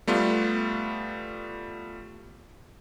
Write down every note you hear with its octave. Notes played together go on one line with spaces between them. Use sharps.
G3 A3 B3 F4